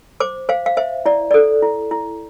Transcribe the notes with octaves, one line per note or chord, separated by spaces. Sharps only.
C5 D6
C5 F5
F5
C5 E5
E4 D5
A4 D5
E4
E4